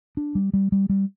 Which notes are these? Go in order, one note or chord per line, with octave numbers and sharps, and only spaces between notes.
D4
G3
G3
G3
G3